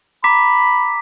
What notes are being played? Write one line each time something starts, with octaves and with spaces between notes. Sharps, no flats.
A#5 B5 D6 B6